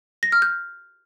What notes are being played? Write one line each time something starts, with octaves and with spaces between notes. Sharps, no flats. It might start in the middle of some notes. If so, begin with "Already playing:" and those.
A#6
F6
G6